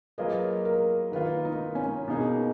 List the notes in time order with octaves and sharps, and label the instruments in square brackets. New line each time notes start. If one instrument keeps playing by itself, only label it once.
[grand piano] F#3 A#3 F4 G#4 D#5 [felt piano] B4
[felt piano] A#4
[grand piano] D#3 A#3 F4 [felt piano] B4
[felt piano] D#4
C#4
[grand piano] B2 A#3 D#4 G#4